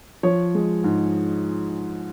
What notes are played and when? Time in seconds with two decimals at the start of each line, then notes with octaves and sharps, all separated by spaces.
0.23 F3 C#5
0.55 G#3
0.84 G#2